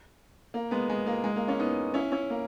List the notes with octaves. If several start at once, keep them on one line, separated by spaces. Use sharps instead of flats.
A#3
G#3 B3
G#3
A#3
G#3
A#3
A#3 C#4
B3 D#4
C#4 E4
C#4 E4
A#3